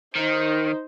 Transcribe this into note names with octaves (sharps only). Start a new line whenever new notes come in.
D#3 D#4 C5